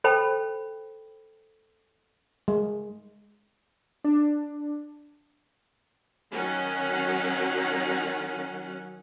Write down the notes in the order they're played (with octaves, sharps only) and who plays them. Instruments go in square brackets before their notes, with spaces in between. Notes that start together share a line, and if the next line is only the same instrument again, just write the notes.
[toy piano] A4 C5 G5 A5 B5
[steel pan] G#3
[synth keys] D4
[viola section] D#3 F#3 C#4 F#5